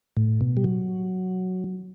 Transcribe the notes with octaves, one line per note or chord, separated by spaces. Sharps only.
A2
B2
G3
F#3